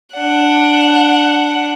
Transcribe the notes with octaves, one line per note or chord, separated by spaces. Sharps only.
D4 F#5